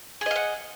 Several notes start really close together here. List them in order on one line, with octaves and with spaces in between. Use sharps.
G#4 D#5 F5 F#5